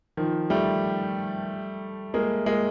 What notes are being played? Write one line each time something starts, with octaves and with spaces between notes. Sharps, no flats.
D#3 F3
G3 A3
G#3 A#3
G#3 A#3